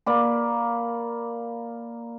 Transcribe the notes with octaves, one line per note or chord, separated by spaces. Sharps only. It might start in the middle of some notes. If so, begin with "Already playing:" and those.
A#3 D5 B5